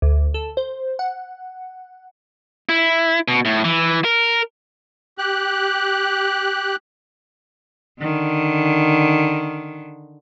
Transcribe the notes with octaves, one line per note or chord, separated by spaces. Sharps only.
D2
A4
C5
F#5
E4
B2
A2
E3
A#4
G4 F#6
D3 D#3